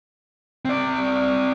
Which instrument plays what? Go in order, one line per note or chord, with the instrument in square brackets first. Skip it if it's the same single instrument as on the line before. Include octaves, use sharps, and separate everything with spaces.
[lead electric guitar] C4 D5